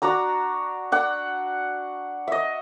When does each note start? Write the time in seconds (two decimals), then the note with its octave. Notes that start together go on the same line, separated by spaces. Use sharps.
0.02 D4 F#4 A#5 E6
0.92 D4 F#5 E6
2.27 D#5 E5